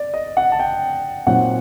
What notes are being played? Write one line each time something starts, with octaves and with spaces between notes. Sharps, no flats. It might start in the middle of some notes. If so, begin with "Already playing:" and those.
Already playing: D5
D#5
F#5
A5
G5
A#2 F#3 C4 D#4 F#5